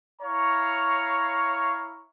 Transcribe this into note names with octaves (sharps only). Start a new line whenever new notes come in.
E4 C#5 F5 A#5 C#6